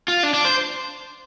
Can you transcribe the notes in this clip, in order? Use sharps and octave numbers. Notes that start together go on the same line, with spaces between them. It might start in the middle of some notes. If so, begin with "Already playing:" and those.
F4
D4
D4
C5